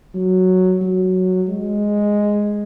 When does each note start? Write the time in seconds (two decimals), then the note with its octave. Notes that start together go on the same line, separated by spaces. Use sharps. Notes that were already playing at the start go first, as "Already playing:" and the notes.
0.15 F#3
0.81 F#3
1.48 G#3